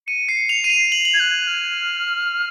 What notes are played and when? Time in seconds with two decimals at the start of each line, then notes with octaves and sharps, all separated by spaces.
0.07 C#7 D#7
0.29 C7
0.35 C#7
0.49 F7
0.64 C7 D#7
0.70 F7
0.92 F#7
1.05 F#7
1.14 G#6
1.20 F#6
1.47 F6